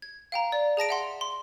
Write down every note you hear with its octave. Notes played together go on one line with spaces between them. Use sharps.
G#6
F5 G5 A#5
D5
G#4 A5 A#6 D7
E5 F#5 C6
C6